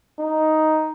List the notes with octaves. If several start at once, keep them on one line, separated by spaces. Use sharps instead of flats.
D#4